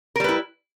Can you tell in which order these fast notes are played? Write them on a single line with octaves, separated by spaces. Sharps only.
A#4 G3 B4 E4